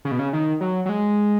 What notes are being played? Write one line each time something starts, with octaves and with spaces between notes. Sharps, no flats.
C#3
B2
C#3
D#3
F#3
F#3
G#3